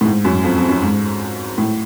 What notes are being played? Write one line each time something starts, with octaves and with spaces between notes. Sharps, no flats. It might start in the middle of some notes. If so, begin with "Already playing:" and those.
A2
G#2
F#2
F2
F2
F#2
G#2
A2